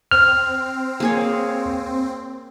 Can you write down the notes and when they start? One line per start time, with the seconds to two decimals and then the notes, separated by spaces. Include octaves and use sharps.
0.11 C4 F6
1.00 A#3 G#4 C#5